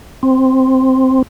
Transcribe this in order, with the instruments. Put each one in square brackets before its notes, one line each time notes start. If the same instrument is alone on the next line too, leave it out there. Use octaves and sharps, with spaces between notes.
[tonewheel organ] C4